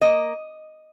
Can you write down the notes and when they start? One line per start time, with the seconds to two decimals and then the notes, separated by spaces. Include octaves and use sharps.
0.01 A#3 D#5